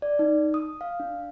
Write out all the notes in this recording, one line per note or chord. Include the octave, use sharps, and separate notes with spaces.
D5
D#4
D#6
F5
D4